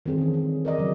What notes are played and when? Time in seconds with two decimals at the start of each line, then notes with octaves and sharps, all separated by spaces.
0.06 D#3 G3 C4 G#4 A4
0.18 E3 C#4
0.34 G#4
0.65 A#4 D5 D#5
0.78 C#3 F#3